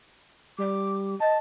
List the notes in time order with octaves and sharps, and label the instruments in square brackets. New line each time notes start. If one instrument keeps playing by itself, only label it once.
[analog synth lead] G3 [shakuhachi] D6
[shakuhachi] D#5 [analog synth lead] A5